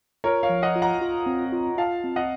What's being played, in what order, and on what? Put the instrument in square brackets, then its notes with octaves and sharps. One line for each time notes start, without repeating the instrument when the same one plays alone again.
[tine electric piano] F4 [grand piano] A#4 C#5
[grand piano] C#5 F5
[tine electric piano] F3
[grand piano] D#5 F#5
[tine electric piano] F4
[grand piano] F#5 A#5
[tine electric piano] F4
C4
F4
[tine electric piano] F4 [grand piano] F5 A5
[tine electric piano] C4
[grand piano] D#5 F#5